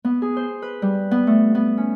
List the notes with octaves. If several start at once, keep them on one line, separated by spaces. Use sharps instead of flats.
B3
G#4
C5
B4
G3
B3
A3
B3
C#4